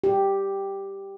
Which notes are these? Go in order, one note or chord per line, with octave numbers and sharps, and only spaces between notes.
G4